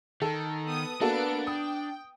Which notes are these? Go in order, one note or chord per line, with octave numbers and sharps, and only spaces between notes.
D#3 A4
B3 D#6
A#3 B3 D4 F#4 A4 D7
G5 D#6